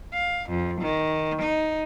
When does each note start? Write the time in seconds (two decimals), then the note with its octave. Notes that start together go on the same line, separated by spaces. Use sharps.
0.14 F5
0.49 F2
0.81 D#3
1.41 D#4